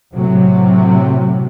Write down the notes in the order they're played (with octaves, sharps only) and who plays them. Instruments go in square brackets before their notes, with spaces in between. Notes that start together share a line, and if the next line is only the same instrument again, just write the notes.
[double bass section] A2 C3 F#3